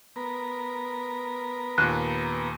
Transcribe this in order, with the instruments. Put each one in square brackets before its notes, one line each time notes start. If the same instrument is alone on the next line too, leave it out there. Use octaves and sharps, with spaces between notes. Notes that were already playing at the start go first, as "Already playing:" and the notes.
[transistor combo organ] B3 A#4
[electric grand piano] D#2 A#2 [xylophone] F#6